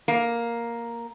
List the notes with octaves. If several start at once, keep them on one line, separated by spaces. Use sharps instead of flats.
A#3